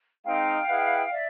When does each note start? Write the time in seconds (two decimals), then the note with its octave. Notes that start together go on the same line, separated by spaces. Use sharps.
0.24 G#3 C4 D#4 F5 G5
0.68 E4 G#4 B4 D#5 F#5
1.11 D5 E5